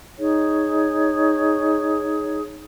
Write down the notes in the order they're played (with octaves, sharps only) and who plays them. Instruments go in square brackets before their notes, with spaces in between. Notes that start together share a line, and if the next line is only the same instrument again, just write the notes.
[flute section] D#4 G#4 C#5